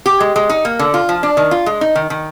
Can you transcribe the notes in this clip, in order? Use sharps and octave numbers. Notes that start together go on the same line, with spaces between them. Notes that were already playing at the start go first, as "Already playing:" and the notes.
G4
G#3
G#3
D#4
A#3
D3
F4
F3
D4
D#3
F4
G#3
D#4
D#3
D#3